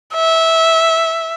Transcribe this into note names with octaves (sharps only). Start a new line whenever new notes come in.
E5